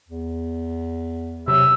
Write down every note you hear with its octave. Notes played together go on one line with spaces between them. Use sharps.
E2
C3 F#3 E5